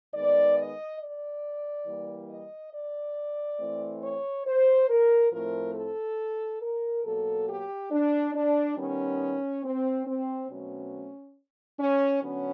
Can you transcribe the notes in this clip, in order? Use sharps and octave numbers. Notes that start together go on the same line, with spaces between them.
D#3 G#3 B3 D5
D#5
D5
E3 G3 A#3
D#5
D5
E3 A3 C4
C#5
C5
A#4
A2 F3 A3 C4 A#4
A4
A#4
B2 F#3 A#3 A4
G4
D4
D4
D#3 G3 B3 C#4
C4
C4
B2 F#3 A3 C4 C#4
C#4
D3 F#3 B3 C#4